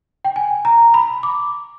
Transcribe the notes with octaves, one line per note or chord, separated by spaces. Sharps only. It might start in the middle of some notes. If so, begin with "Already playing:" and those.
G5
G#5
A#5
B5
D6